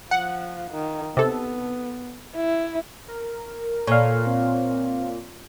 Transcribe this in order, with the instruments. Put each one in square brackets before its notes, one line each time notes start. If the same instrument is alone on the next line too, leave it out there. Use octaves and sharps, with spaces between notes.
[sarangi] F3 [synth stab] F#5
[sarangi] D#3
[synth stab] C3 A4 [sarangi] B3
[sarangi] E4
[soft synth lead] A#4
[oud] A#2 [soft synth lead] A4 [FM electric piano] C#5 F5
[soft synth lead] C4